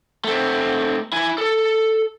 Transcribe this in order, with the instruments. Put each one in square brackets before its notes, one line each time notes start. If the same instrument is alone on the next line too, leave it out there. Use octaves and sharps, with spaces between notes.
[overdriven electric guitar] A3 C4
E4 G#5
A4